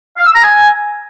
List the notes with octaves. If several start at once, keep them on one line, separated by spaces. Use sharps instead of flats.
F5
E6
A#5
G#5